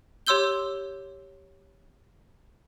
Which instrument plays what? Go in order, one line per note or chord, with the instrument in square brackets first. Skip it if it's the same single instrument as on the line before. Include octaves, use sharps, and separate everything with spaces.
[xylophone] G4 C#5 C6 E6 G6 G7